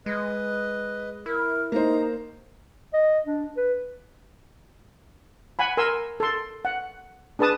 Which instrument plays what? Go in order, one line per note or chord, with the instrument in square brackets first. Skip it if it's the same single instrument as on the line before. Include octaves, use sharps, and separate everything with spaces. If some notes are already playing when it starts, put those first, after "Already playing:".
[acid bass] G#3 [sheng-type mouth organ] B4 D#5
[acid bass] E4 [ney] A#4
[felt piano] A#3 C5 [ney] D#4 [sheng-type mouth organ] A#5
[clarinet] D#5
D4
B4
[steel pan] F#5 G#5 B5
A#4 G#5 C6 E6
A4 C6
F#5
D4 G#4 B4 A5 D#6